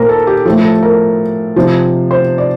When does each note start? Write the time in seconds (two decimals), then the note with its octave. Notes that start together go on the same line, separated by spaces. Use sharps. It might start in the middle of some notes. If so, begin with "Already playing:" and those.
Already playing: A#2 A#4 C5
0.09 A4
0.27 G4
0.45 F3 A4
0.49 A2
0.64 A4
0.83 A#4
1.56 C3 F3
2.11 C5
2.38 D5